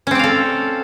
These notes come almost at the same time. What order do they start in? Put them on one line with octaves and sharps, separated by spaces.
C#4 C4 D5 F5 A4